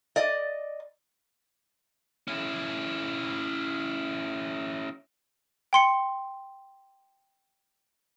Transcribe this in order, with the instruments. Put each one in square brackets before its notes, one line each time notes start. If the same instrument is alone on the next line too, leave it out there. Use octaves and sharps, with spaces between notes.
[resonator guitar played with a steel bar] D5 D#5
[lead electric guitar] C#4 E4
[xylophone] G5 C6 C#7